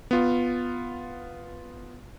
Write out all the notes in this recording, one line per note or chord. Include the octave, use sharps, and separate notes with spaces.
B3 F4